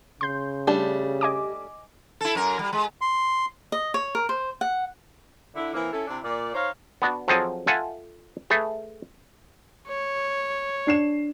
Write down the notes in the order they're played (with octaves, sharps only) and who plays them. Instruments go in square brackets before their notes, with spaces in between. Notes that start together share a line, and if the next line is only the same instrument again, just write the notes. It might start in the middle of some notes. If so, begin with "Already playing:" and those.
[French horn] C#3 [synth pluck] C6 G6
[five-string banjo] G3 A3 D4 [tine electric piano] G4
[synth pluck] D#5 G#5 D6
[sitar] E4 A4
F#2 A#4
G3
G#3
[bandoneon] C6
[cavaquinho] D#5
C#5
A#4
C5
F#5
[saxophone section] D3 E4
E3 A#3 C4 E4
C#4 E4 A4
C3 D4 E4
A#2 D5
D#4 C5 C#5 F5
[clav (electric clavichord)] B3 D4 F#4
F3 F#3 C4 G#4 A4 D#5
F4 A4 E5 F#5 G#5
A3 G#4 A4 B4
[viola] C#5
[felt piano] D4 C7 E7